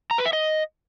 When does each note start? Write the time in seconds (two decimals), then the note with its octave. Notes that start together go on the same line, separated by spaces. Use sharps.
0.11 A#5
0.18 B4
0.26 E5
0.33 D#5